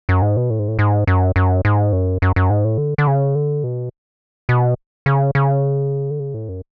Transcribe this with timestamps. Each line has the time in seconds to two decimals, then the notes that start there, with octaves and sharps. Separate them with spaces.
0.09 F#2
0.22 G#2
0.37 B2
0.50 A2
0.59 G#2
0.68 A2
0.79 G#2
1.07 F#2
1.36 F#2
1.65 G#2
1.93 F#2
2.22 F#2
2.36 F#2
2.50 G#2
2.65 A2
2.78 D3
2.98 D3
3.07 C#3
3.35 D3
3.64 B2
4.49 B2
5.06 C#3
5.35 C#3
6.10 D3
6.20 C#3
6.34 A2
6.49 F#2